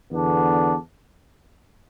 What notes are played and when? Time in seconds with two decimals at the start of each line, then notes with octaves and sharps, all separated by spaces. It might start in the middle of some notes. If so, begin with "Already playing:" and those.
0.10 E2 D3 B3 D4